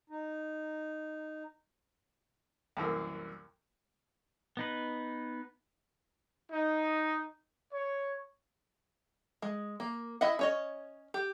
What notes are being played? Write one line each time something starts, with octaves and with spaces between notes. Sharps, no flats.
D#4
C2 F#2 E3 A#3
B3 D#4 B4
D#4
C#5
G#3
A#3
E4 D#5 E5 F#5
C#4 C#5 D#5
G4